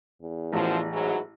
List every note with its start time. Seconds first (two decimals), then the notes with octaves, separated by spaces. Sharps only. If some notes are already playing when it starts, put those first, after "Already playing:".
0.21 E2
0.53 A1 F#2 F3
0.92 G#2 E3 F#3 G#4